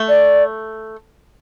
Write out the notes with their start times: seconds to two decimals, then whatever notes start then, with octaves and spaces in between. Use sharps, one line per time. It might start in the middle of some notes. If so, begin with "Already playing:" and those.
Already playing: A3
0.09 D5